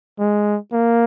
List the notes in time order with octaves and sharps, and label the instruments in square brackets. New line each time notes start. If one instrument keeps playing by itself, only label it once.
[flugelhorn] G#3
A#3